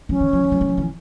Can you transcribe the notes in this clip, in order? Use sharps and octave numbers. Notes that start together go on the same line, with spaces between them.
F3 C#4
D#3
F3
E3
F3
F#3
F3
E3